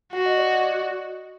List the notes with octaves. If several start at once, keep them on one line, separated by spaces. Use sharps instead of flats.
F#4 F#5
D#5
D5
D#5